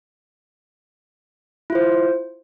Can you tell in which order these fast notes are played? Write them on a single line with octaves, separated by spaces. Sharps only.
E4 F4 C5